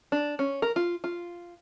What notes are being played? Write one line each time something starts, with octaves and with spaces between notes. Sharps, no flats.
D4
C#4
A#4
F4
F4